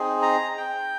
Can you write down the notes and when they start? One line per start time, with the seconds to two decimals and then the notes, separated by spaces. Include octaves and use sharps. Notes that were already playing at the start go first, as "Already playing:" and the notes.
Already playing: C4 D#4 G#4
0.22 A#5
0.57 G5